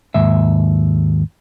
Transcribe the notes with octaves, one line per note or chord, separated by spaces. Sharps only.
D#2 G#2 E5